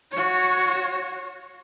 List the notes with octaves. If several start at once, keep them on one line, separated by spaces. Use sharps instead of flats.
F#4 C#5